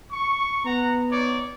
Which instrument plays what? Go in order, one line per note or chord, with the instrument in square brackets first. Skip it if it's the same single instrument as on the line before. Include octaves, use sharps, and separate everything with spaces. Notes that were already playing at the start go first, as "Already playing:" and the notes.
[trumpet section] C#6
[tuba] B3 [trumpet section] F#5 A#5
[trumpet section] D#4 C#5 D5